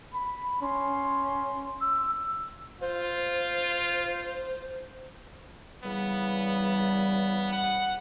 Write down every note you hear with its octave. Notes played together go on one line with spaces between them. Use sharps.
B5
C#4 C6
E6
F4 C5
C#3 E3 G3 B3
F#5